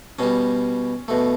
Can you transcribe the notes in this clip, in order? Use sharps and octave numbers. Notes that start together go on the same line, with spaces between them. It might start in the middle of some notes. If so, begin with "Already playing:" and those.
B2 G3 C#4
B2 A3